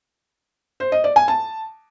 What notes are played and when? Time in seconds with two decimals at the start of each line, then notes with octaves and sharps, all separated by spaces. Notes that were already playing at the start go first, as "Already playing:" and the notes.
0.80 C5
0.92 D#5
1.04 D5
1.16 G#5
1.28 A5